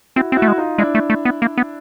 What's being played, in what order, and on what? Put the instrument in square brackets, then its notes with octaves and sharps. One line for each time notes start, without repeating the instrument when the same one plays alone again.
[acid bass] C4 [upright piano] E4 F#4
[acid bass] C4
[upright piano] E4 F#4
[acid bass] A3
G#3
[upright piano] D#4 F4
[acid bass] G#3 [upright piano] D4 E4
[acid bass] A3
A3
B3
A#3
B3